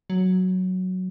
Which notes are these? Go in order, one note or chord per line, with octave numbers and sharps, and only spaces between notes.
F#3